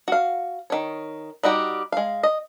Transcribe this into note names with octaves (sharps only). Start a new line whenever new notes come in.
F#4 F5
D#3 C#5
G3 D#4 F#4 G4
G#3 F5
D#5